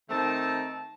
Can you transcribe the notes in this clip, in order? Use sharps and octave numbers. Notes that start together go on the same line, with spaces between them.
D#3 A3 C4 D#4 A5